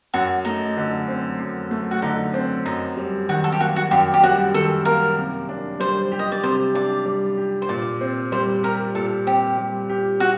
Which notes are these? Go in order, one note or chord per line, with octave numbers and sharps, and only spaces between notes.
F#2 F#4
A3 D#4
D3
C4
F#2
A3
F#4
D3 D#4
C4
F#2 D#4
G3
D#3 F#4
A4
G4
A#3 F#4
F#4
F#2 G4
G4
G3 F#4
D#3 A4
A#3 A#4
C3
D4
G3 C5
G4
D#5
D5
C3 C5
D4 D5
G3
G4
C5
A#2 D5
C4
G3 C5
G4 A#4
A#2 A4
C4 G4
G3
G4
F#4